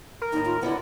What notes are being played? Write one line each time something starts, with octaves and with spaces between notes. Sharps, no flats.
A#4
D#2 A2 D#4
F4
D3 F#3 B3 E4